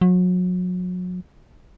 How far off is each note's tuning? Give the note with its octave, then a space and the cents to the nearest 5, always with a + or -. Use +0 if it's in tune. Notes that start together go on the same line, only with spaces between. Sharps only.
F#3 -35